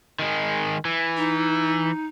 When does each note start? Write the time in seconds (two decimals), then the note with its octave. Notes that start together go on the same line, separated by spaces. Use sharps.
0.19 D#3 G#3
0.85 E3
1.17 D#4